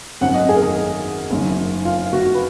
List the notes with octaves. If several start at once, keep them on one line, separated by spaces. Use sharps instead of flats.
G#1 F#2 D#3 F#5
D#5
G#4
A#4
G#4
F#1 F#2 D#3
F4
F#4
B4